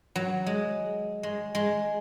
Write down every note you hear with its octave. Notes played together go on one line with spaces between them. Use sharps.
F#3
G#3
G#3
G#3